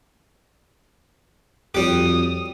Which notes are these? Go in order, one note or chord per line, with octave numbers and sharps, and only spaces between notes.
F2 G3 F#4 G4 C#5 D#6